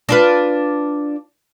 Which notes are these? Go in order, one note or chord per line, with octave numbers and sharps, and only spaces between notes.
D4 F4 B4